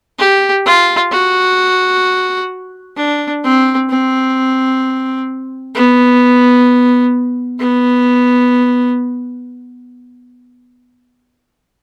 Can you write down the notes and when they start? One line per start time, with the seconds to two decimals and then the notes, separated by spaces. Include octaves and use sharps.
0.19 G4
0.65 F4
1.12 F#4
2.97 D4
3.43 C4
3.89 C4
5.74 B3
7.59 B3